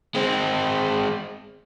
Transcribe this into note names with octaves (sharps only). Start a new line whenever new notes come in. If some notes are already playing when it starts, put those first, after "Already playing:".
G#3 C4